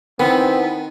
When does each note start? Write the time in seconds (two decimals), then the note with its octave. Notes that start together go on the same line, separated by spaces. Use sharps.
0.20 D#3 B3 C4 D#4 E4 G#5